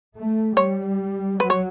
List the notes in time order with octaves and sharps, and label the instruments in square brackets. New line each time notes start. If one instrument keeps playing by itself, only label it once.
[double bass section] A3
[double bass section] G3 [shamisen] C#5
[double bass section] F#3 [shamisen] B4
[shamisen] C#5